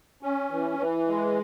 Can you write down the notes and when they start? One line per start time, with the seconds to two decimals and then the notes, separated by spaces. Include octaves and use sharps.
0.23 C#4
0.51 E3
0.79 E3
1.07 G#3